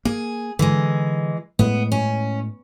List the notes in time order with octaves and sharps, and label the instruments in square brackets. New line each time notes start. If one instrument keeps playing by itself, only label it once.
[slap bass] A#3 [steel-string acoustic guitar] G#4
[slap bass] D3 [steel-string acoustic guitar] E3 G#3
[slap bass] A2 G#3 [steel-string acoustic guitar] B3
[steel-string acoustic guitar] C#4